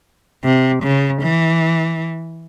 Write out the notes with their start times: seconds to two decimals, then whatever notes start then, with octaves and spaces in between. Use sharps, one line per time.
0.44 C3
0.83 C#3
1.22 E3